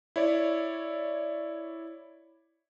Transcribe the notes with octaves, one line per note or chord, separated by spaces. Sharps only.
E4 C#5 D5